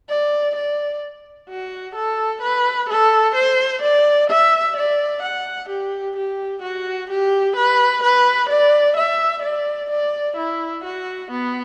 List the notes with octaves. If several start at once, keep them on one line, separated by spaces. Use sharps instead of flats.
D5
D5
F#4
A4
B4
A4
C5
D5
E5
D5
F#5
G4
G4
F#4
G4
B4
B4
D5
E5
D5
D5
E4
F#4
B3